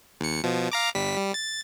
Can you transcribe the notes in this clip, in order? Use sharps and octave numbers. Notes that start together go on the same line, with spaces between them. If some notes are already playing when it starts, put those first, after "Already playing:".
D#2 C#7
B2 F3
F5 A#5 D6
G1 G3 B6
G3
A6